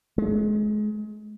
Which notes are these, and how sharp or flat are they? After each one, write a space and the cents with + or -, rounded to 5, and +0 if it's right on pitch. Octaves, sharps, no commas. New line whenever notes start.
G#3 +30